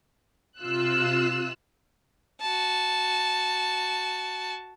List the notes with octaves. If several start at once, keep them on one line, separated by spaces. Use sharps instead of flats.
C3 F4 E6 F#6
F#4 A5